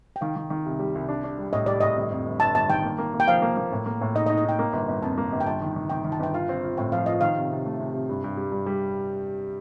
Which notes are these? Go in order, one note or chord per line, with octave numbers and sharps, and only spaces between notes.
G5
D#3 F5
D#3
D#3
C2
G3
C2
D4
D4
G3
A2 D#5
G3 D5
A2 D#5
G1
F2
G1
G1 A5
G1 A5
D#3 G5
A#3
A#3
A#3
G5
F3 F5
A#3
A#3
A2
A#3
A2
D#4 D#5
D#5
D#4
D#5
D#4 G5
A#3
G1
G1
F2 A5
A#3
G1
G5
G1 A5
D#3
D#3
D#3 G5
D#3
A5
G1 G5
F4 F5
C4
F4
A2 G5
F3 F5
F4 D#5
D#3 F5
C3
C3
A3
C3
C3
G2
G2
G3
G2
G3